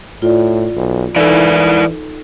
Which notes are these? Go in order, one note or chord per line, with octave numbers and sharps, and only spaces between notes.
A2 F4 D5
B1
E3 D#4 E4 A4 A#4 D5 E6